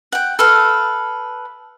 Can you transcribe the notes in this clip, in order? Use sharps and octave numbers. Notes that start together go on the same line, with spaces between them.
F#5 G5
A4 B4 F5